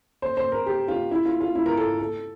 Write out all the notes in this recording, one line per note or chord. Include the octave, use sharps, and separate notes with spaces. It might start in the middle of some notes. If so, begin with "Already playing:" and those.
C5
C5
A#4
G4
F4
E4
F4
F4
E4
A#4
A4
A4